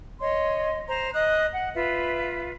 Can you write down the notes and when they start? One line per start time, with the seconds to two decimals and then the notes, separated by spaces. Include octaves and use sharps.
0.20 C#5 D#5 C6
0.88 C5 A#5
1.13 D#5 D#6 F#6
1.52 F#5
1.74 F4 B4 E5